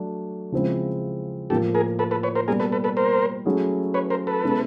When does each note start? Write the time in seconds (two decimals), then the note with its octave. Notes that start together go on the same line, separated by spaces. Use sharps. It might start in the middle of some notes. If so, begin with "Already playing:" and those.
Already playing: F#3 A3 D4
0.52 C#3 F3 G#3 C4 E4
1.50 A2 F3 A#3 G4 A4
1.74 G#4 A#4
1.99 A4 B4
2.11 A4 B4
2.23 B4 C#5
2.35 A#4 C5
2.47 B2 G3 A#3 G#4 A#4
2.60 A4 B4
2.72 A4 B4
2.84 A4 B4
2.97 A#4 C5
3.45 F#3 A3 C#4 E4 G#4
3.94 B4 C#5
4.10 A#4 C5
4.27 A4 B4
4.43 B2 G#3 C#4 E4